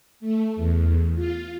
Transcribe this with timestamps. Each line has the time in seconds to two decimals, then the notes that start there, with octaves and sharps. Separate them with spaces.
0.20 A3
0.56 E2
1.15 F4